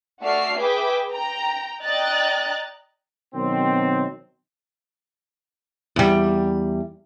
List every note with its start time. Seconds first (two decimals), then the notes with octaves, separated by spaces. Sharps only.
0.21 A3 F#4 D5 E5 F6 C7
0.59 G#4 B4 E5 G5 D6
1.11 G5 A#5
1.83 D5 D#5 G5 A#5 F#6 A6
3.35 B2 D#3 F#3 C4
5.96 E2 G3